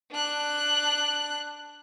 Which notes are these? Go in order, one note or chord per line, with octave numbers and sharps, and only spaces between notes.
D4 F#6